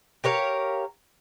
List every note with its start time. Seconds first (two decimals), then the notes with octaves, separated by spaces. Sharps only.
0.24 G4 A#4 C#5 F5